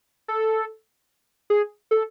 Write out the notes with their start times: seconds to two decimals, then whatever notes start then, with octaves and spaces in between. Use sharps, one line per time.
0.28 A4
1.50 G#4
1.91 A4